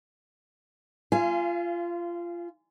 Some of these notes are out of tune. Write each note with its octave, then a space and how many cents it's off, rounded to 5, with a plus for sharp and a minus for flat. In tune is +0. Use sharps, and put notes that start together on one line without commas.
F4 -20 F5 -40 G#5 +0